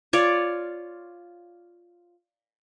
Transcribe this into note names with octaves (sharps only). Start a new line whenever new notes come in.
F4 C#5 D5